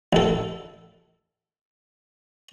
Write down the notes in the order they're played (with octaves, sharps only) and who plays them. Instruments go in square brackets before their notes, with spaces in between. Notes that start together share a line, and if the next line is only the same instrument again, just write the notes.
[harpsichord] A1 A4